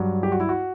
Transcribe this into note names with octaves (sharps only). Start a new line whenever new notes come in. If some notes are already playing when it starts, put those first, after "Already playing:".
Already playing: G2 F#3
G4
F#4
E4
F#4